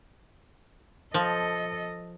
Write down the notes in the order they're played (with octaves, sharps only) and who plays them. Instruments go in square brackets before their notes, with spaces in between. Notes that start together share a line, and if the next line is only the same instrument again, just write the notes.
[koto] F3 [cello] A4 D#5